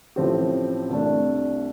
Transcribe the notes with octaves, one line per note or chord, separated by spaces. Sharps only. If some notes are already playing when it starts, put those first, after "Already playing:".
A1 A2 F3 C4 G4
C2 C3 A3 D4